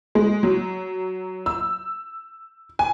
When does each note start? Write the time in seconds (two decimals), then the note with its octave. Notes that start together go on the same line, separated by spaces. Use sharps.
0.15 G#3
0.43 F#3
1.46 E6
2.79 G#5